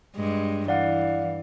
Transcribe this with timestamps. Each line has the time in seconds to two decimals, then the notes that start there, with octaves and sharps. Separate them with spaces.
0.16 G2 G#3
0.68 E3 D5 F5 F#5